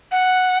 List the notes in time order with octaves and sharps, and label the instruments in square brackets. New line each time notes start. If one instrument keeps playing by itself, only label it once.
[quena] F#5